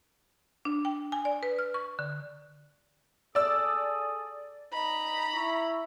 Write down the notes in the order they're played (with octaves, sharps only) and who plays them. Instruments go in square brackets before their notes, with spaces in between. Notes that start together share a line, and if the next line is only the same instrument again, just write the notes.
[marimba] D4
G5
G#5
D5
B4
F6
C#6
D3
[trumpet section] G#4 A4 D#6 [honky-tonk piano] D5 E6
[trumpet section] D#4 D#5 [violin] A#5 B5
[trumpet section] E4 C#6